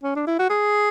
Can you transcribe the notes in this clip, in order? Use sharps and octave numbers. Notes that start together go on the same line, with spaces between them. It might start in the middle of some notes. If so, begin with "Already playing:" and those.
C#4
D4
E4
F#4
G#4